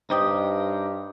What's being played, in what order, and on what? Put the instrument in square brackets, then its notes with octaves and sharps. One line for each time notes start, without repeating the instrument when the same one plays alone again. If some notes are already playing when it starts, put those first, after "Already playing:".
[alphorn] G2 [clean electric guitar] D#4 G4 [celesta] C5 D#5 D#6